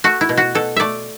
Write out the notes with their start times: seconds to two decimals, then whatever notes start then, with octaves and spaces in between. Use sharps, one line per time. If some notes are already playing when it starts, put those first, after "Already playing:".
0.04 A3 F#4
0.21 E4
0.29 B2
0.37 F#4
0.55 B2 A4
0.76 A3 D5 E5